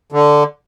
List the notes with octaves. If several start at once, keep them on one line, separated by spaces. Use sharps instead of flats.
D3